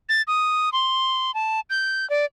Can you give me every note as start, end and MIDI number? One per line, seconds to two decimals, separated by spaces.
0.09 0.22 93
0.27 0.69 87
0.72 1.34 84
1.34 1.60 81
1.70 2.08 91
2.10 2.25 74